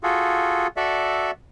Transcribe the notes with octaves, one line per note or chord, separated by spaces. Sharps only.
F4 F#4 G#4 A4
F#4 A4 D5 E5